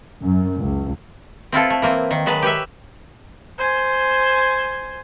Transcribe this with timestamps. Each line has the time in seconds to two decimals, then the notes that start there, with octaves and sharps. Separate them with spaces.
0.23 F#2
0.59 C#2
1.52 C4 E4 F4 A4
1.70 A3
1.82 E3 A#3 C4
2.11 D#3
2.26 F#3 G#3 B4 A5
2.42 G4 B4 C#5 E5
3.58 C5 G#5